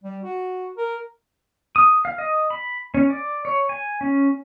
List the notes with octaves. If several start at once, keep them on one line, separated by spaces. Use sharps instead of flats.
G3
F#4
A#4
D#6
F5
D#5
B5
C#4
D5
C#5
G#5
C#4